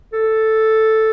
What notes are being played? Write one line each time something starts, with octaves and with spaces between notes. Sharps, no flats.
A4